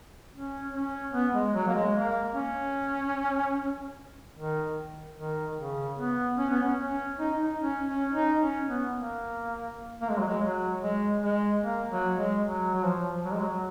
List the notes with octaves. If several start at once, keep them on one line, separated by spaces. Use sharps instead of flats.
C#4
C#4
B3
G#3
F#3
A#3
G#3
A#3
C#4
D#3
D#3
C#3
B3
C#4
B3
C#4
C#4
D#4
D#4
C#4
C#4
D#4
C#4
B3
A#3
A#3
G#3
F#3
G#3
F#3
G#3
G#3
A#3
F#3
G#3
F#3
F#3
F3
F#3
G#3
F#3